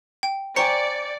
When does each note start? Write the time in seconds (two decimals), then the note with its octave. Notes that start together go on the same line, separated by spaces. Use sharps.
0.23 G5
0.56 C5 D5 G5 G#5 A#5 C#6 C#7